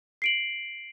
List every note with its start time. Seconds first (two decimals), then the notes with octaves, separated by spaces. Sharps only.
0.22 C7 D7 F#7